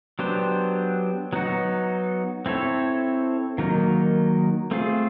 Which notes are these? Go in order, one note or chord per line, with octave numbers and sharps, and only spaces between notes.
F#3 B3 D4 G4 C5
F#3 B3 D#4 F#4
C4 E4 A4 C#5
D#3 F#3 A#3 D#4
A3 C4 F4 G#4